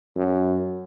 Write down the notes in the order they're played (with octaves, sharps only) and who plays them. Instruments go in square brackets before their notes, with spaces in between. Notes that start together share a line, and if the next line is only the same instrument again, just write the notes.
[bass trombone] F#2